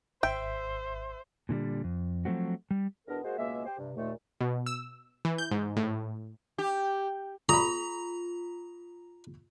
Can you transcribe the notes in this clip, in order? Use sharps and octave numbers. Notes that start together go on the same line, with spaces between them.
G#1 C5 E5 G5
A#2 D3 F#3 G3
F2
F3 F#3 A3 C4 F#4
G3
E2 B2 B3 D4 A#4
G#3 A#3 F#4 G#4 C5
C#2 B2 G#3 A#3 E5
G4 C5
G2 C3
D#2 A#2 A3
B2
E6
E3
G6
G#2
A2
G4
F4 A#5 B5 D#6